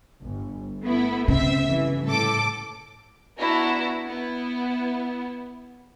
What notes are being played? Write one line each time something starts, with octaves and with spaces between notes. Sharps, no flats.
G1
A3 B3 E4
C#3 C4 E5
G1 E3
A2 A4 D6
B3 D4 E4 F#4 A#5
B3 E4